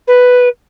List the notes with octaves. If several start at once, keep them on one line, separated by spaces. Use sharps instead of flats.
B4